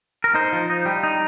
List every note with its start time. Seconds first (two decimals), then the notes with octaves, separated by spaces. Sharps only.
0.24 A#4
0.34 D#4 C5
0.53 F3
0.70 D#4
0.86 G3
1.03 D#4